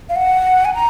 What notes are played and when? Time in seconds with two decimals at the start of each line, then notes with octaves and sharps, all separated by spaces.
0.09 F5
0.16 F#5
0.65 G#5
0.74 A#5